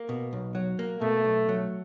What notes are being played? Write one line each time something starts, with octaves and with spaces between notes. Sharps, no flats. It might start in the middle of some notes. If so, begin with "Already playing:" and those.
Already playing: A#3
B2
B1
F#3
A#3
B2 A3
B1
F#3